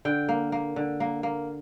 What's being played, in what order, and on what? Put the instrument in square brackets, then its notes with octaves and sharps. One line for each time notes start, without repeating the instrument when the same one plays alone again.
[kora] D3 G5
A#3
A#3
D3
A#3
A#3